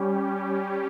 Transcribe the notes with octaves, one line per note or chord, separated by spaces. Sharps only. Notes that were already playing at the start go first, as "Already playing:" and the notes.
Already playing: G3 C#4 G4